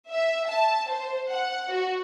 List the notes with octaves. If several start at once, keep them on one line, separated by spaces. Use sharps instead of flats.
E5
A5
C5
F#5
F#4